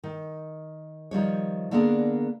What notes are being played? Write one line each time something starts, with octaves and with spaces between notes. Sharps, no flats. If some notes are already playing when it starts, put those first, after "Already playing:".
D#3
D#3 F3 G3 C#5
D3 A#3 B3 D4 G#4 A#4